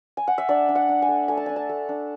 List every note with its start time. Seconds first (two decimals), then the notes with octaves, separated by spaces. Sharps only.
0.17 G#5
0.27 F#5
0.38 E5
0.49 D4 D5
0.69 D4
0.75 F#5
0.89 D4
1.02 G#5
1.09 A3
1.28 A3 G#5
1.37 A5
1.46 D4 G#5
1.56 A5
1.69 A3
1.89 D4